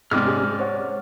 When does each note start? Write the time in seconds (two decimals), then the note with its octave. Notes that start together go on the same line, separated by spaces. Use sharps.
0.11 G#2 C3 D5 D6 F6
0.25 C#4 G4 G#4
0.43 G#3
0.59 C5 C#5 F#5